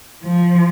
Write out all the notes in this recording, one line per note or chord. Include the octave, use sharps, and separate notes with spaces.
F3